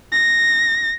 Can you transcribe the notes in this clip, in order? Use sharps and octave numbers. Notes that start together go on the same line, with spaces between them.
A#6